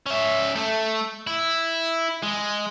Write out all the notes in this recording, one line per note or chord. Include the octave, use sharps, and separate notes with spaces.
C#4 E5
A3
E4
G#3